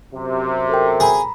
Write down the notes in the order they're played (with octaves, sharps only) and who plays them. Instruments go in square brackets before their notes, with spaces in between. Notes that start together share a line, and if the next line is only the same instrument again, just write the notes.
[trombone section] F#2 C3
[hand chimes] A4 A#4 G5
[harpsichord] G#4 [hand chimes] A#5 B5